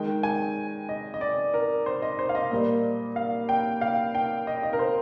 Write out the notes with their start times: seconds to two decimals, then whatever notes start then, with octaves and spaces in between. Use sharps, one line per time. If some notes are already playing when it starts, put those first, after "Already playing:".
Already playing: D#3 G#3 G5
0.23 G#5
0.89 D#5
1.14 D#5
1.21 D5
1.54 A#4
1.86 C5
2.02 D#5
2.19 C5
2.29 F5
2.35 D#5
2.51 A#2 G3 A#3
3.16 F5
3.49 G5
3.81 F5
4.15 G5
4.47 D#5
4.63 D#5
4.73 A#4
4.79 C5